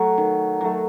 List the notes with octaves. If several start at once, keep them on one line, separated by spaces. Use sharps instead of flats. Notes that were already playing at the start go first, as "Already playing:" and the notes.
Already playing: F#3 A3
D#3
F#3 A3